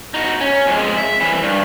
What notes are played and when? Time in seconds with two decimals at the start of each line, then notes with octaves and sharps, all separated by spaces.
0.14 D#4 F#4
0.41 C#4
0.67 F2 G#3
0.97 E5
1.20 C2 E3
1.43 G2